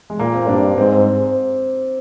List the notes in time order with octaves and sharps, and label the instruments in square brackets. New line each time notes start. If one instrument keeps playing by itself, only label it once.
[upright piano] G#3
[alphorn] A#2 [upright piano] A#3
[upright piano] C4
[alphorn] G2 [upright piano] D4
[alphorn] G#2 [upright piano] C4